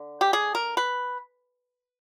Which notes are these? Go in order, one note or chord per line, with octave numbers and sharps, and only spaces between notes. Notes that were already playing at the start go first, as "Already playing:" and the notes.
Already playing: D3
G4
G#4
A#4
B4